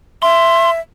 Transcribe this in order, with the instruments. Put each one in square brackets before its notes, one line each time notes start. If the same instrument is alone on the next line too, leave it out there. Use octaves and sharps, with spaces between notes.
[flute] E5 [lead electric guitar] C6